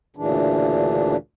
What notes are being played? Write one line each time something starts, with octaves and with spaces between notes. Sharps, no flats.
D2 A#2 C#3 E3 D4